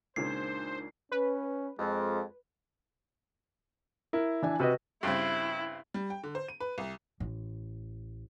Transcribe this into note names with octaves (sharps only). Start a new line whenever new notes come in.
C#2 A#2 C#3 D4 D#4 A#4 C5 C7
C#4 B4
F2 G#3
E4 A#4
E3 D4 G#5
C3 F#4 B4 D#5
G2 C#3 C4 E4
G3
G5
D3
C5
D#7
B4
C2
A1